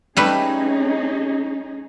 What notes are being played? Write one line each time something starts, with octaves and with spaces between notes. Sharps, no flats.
G3 A3 C#4 D#4 G#4 B4